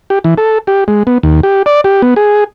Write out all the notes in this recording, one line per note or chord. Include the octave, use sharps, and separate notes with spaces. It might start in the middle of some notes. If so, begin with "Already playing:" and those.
G4
E3
A4
G4
G#3
B3
D#2
G4
D5
G4
B3
G#4